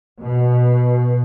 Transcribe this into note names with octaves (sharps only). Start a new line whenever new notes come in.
B2